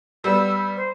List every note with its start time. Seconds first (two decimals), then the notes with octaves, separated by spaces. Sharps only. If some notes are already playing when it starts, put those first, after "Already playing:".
0.24 G3 B3 E6
0.76 C5